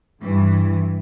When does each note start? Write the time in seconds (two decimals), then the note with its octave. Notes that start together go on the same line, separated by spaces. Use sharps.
0.21 G2 E3